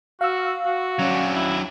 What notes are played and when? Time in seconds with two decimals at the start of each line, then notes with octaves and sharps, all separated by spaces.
0.21 F#4 F5 E6
0.65 F#4
0.99 F#3 C#4 D4
1.35 E4